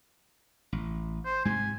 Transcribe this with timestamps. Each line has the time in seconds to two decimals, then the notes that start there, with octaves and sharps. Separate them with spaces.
0.73 A1
1.25 C5
1.45 G#2 C3 G3 G#5